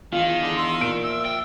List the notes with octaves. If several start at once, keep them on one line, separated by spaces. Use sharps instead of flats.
E2 D#3 F4 G#5
D3 G#3
F5 C6 E6
A#2 D7
F3 E5 E6
G5